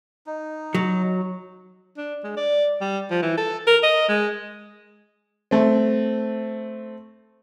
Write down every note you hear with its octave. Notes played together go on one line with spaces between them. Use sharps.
D#4
F#3
D4
G#3
D5
G3
F3
E3
A4
A#4
D#5
G#3
A3 C4